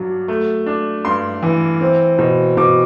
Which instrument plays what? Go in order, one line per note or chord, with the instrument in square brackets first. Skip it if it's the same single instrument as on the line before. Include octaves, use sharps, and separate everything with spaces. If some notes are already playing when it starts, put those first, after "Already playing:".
Already playing: [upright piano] G2 F#3 D4
A3
D4
G2 C6
E3
C4
B2
B2 D6